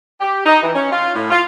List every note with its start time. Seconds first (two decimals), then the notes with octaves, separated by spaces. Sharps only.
0.21 G4
0.46 D#4
0.63 E3
0.75 C#4
0.92 F4
1.15 A2
1.31 F4